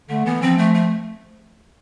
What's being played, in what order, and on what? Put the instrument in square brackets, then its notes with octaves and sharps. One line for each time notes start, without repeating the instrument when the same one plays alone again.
[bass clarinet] D3 [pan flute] A3
[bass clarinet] E3 [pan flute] B3
[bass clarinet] F3 [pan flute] C4
[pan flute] A3
A3